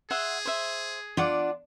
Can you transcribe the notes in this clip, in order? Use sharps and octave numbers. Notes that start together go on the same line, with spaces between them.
G#4 E5 F#5 C6
C5 E5
D4 F4 D5 F#5 D6